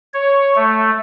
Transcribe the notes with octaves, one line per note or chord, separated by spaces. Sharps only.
C#5
A3